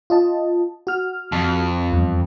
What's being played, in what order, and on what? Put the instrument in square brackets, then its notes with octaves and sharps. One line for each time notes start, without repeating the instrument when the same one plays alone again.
[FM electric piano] F4 D#5 A5
F#4 F6
[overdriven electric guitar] F2
[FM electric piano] E2 G2